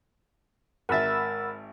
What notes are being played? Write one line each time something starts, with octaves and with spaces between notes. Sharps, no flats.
G#1 A#4 E5 F#5 B5 E6 A6